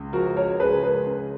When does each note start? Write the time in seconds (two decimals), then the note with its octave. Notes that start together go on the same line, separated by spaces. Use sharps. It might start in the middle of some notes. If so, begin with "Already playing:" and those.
Already playing: C#2
0.13 F3 F#4 A#4
0.36 A#4 C#5
0.60 C#2 G#4 B4
0.83 G#4 B4
1.06 C#3